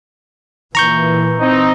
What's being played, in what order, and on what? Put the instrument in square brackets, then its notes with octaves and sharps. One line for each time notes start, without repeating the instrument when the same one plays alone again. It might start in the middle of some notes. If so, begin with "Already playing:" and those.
[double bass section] A#2 E3 [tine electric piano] A#5 C#6 G6
[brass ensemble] C4 D#4